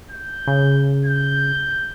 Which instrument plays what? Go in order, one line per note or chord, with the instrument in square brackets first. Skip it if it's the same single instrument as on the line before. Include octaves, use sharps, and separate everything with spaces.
[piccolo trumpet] G6
[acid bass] C#3
[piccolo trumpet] G6